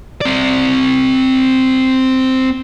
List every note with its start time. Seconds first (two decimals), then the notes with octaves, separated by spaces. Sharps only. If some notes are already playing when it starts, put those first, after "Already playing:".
0.21 C4 D5